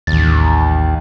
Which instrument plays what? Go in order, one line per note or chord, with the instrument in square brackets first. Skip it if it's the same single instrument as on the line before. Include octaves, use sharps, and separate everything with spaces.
[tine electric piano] A1 A6 [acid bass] D#2